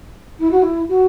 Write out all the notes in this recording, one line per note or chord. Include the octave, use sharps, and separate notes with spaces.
E4
F#4
E4
F#4